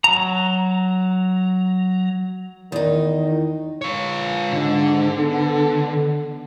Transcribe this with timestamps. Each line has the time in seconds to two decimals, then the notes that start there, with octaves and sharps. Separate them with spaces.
0.04 F#3 A#5
2.72 E2 D#3 D#4
3.82 F4 C#5
4.52 G#2 D3
5.16 B3 A4